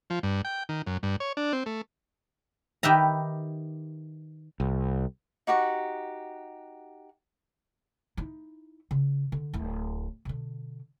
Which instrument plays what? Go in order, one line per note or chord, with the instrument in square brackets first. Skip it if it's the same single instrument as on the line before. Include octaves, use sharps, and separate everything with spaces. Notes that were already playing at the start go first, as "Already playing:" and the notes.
[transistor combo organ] F3
G2
G5
D#3
F#2
G2
C#5
D4
C4
A3
[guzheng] D#3 G4 B4 E5 A#5
[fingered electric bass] C2
[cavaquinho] D#4 F#4 G4 F#5
[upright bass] D#4 E4
C#3
D3
D1 E4
B2 D3